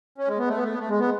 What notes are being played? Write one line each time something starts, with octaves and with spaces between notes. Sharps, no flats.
C#4
G#3
B3
A3
B3
A3
B3
A3
G#3
B3